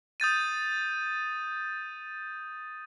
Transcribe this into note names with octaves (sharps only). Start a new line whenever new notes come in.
D#6 G6 A6 D#7